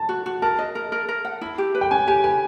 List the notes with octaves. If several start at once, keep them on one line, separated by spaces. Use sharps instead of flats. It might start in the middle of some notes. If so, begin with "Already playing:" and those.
Already playing: A5
F#4
F#4
A#4 A5
D#5
A#4
A#4
A#4
F#5
E4
G4
B4
G5
C#4 G#5
G4 G#5
B4 G#5